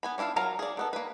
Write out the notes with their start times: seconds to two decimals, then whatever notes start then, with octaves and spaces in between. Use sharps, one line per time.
0.03 B3 G#5 B5
0.18 C#4 D4 E4 F4 F5
0.36 F#3 F4 A#4 F5 A#5
0.59 G#4 D5
0.77 D#3 B3 A4
0.93 A#3 B4